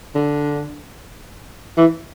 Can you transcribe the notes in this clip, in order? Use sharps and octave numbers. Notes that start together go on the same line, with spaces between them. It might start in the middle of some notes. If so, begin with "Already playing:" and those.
D3
E3